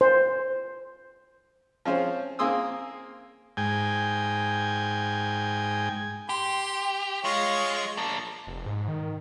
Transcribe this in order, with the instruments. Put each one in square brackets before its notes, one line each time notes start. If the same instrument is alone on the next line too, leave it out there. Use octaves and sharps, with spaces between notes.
[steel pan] C5
[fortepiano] F3 C4 C#4 F4 G#4 C5
A#3 C4 G#4 C6 D#6 E6
[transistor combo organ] G#2 G5 G#5
[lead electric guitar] G4 [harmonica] C6
[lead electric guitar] G#3 [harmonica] F4 C#5
[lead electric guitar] A#3 D4
[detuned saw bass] F1
G#2
D#3